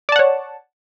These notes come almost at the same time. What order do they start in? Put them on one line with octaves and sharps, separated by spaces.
D5 A5 F#5 C#5